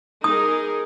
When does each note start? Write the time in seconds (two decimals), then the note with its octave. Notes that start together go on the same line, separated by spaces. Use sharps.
0.24 D#4 G#4 A#4 D#6